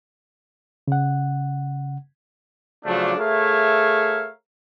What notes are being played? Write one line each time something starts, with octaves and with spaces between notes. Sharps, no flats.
C#3 F#5
C#3 F3 F#3 A3 D4
A3 G#4 A#4 C#5 E5 F5